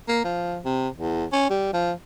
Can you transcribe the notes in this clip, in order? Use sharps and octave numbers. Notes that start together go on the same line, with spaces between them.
A#3
F3
C3
E2
C#4
G3
F3